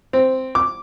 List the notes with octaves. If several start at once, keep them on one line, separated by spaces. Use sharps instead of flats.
C4
D6